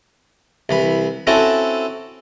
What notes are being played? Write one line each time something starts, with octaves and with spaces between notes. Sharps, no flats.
C2 E3 B5
C4 C#4 E4 F#4 A4